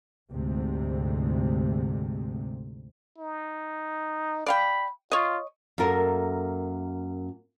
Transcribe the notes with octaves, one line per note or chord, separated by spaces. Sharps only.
D2 G#2 C3
D#4
D5 F5 G5 B5
F4 C#5 D#5
F#2 A#3 A4 A#4 E5